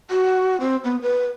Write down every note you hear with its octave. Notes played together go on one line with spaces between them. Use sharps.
F#4
C4
B3
B4